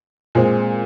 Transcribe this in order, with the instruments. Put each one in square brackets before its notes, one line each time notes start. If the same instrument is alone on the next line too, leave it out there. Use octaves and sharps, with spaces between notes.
[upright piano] A#2 G#3 C4